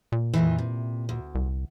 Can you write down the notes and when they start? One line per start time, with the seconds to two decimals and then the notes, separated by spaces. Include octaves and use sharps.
0.12 A#2
0.34 F2 D#3 E3
0.58 C3
1.09 D2
1.35 C2